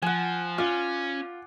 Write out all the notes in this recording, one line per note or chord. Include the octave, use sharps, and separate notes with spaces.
F3 F#5 G#5
C#4 F4 D5